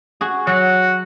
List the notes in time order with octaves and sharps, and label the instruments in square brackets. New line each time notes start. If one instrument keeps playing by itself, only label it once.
[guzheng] F#4 G#4
[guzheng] F#3 [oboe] F#4